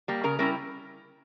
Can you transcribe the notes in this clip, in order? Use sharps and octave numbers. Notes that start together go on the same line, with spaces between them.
G3 A#3
C#3 A#4
G3 C#4 E4 A#4